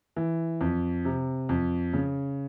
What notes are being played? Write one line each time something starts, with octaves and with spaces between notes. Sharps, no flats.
E3
F2
C3
F2
C#3